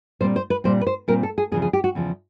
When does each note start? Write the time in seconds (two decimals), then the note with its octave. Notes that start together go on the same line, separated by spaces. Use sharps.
0.20 A#2 G3 C4 C5
0.36 C5
0.50 B4
0.64 A#2 G3 C4 C5
0.81 B4
0.87 C5
1.08 A#2 G3 C4 A#4
1.23 A4
1.38 G#4
1.52 E2 C#3 F3 G#4
1.62 G#4
1.73 G4
1.84 F#4
1.95 E2 C#3 F3